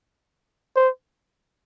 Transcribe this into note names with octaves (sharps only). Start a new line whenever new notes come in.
C5